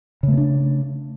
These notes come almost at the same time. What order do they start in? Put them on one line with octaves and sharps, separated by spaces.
C#3 A3 B3 D4